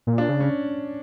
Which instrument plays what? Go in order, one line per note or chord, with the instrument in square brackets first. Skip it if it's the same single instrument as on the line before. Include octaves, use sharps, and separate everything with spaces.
[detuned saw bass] A#2
[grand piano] D4
[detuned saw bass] C#3
[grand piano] C#4